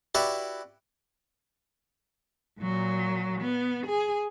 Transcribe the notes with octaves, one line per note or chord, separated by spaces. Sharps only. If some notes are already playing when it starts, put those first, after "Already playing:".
E4 F#4 G4 B4 D5 E5
A#2 F#3
B3
G#4